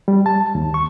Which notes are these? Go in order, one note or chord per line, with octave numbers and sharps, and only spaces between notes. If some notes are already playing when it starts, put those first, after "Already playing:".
G3
A5
D#2
C#6